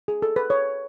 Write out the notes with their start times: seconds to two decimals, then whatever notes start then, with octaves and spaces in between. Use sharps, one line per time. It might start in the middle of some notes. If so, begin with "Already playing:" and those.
0.08 G#4
0.22 A4
0.36 B4
0.50 C#5